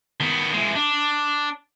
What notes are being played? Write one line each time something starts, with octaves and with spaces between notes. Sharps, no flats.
D#3 B3
E3 G#3
D4